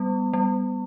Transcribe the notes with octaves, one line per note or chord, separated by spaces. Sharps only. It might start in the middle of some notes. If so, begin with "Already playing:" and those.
Already playing: G3 B3
G3